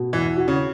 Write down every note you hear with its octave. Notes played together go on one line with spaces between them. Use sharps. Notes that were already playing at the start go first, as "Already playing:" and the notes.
Already playing: B2
E2 E3
F#4
C#3